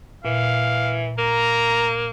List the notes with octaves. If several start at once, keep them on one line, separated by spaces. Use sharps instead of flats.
A#2 E3 F5
A#3 A#5